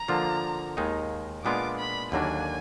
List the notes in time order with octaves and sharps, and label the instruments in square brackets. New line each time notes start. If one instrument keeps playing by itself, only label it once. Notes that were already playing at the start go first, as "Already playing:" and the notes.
Already playing: [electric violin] A#5
[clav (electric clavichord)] D3 F3 A#3 F4
D#2 D#3 G#3 D#4
[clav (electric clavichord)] A#2 G#3 B3 D4 F4 [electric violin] D6
[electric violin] B5
[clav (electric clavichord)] D#2 D3 F#3 A#3 D4 [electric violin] G#5